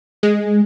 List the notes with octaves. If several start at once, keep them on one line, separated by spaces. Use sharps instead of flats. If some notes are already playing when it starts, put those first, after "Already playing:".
G#3